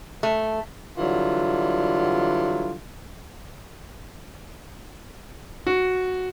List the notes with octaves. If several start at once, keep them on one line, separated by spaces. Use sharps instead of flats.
A3
D3 E3 F#3 G3 F4
F#4